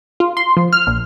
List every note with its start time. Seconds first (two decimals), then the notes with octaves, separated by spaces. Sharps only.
0.20 F4
0.37 C6
0.57 F3
0.73 F6
0.87 A#1